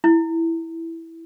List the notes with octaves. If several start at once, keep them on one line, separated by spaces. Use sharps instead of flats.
E4